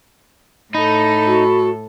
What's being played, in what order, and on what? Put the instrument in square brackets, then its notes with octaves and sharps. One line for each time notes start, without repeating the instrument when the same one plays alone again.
[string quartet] A2 A4 [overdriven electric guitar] D#4 [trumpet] B5
[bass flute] F#4